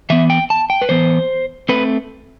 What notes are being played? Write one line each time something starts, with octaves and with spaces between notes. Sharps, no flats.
E3 B3 E5
G5
A5
G5
B4
E3 B3 C5
A3 C4 B4